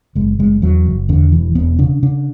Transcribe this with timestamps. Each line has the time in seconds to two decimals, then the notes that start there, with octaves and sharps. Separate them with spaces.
0.15 F#1 G#3
0.39 F#1 G#3
0.62 E2 F#3
0.86 F#1
1.09 E2 D3
1.32 E1 E3
1.55 E1 B3
1.79 C#3 D4
2.03 C#3 D4